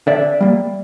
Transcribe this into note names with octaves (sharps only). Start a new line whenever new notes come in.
D3 D5 E5
G3 A#3